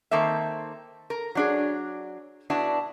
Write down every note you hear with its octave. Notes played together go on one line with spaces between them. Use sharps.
D#3 A#3 C4 A4 E5
A#4
F#3 D4 G#4
B3 D4 E4 F#4